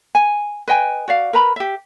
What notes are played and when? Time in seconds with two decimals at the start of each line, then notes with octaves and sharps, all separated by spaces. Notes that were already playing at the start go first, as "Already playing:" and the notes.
0.15 G#5
0.68 B4 D#5 G5 G#5
1.08 F#4 D5 F5
1.33 A#4 B4 A#5 B5
1.56 G4 E5